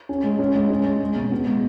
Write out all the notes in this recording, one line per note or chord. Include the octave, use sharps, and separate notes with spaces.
C#4
G#3
C#4
G#3
C#4
G#3
G#3
B2
B3
G#3